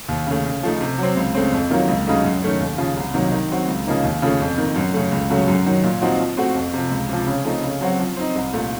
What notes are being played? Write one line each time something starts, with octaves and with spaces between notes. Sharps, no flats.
D#2
C#3 A3
C#3
F3 A3 D#4
C3
F#3 C4
C#2
C#3 A3 C4
F2
D#3 F#3 A#3 F4
C#2
C#3 F#3 A3 D#4
F#2
D#3 A3 C#4
D#2
C#3 F3
C2
C3 D#3 F#3 A#3
D#3
F#3 C4 F#4
C#2
C#3 F3 A#3 D#4
D#2
C#3 F3 A3
F2
D#3 A#3
F#2
C#3 A3
C#2
C#3 F#3 A3
F#2
D#3 F#3
A#2
F3 C4 D#4 F#4
F3
A3 C4 F#4
F2
C3 F3
C#2
C3 F3
C#3
F3 A3 C4 D#4
C#3
F#3 C4 F#4
F3
C4 D#4
C2
A#2 A3